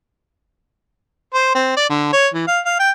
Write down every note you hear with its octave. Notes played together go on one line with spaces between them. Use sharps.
C5
C4
D5
D3
C#5
E3
F5
F5
G5